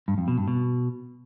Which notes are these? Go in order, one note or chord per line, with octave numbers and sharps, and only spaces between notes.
G2
F2
B2
G2
B2